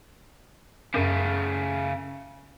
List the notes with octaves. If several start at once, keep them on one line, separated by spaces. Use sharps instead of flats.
F#2 C#3 A3